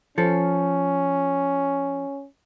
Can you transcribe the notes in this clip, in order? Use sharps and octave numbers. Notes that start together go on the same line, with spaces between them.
F3 C#4 A4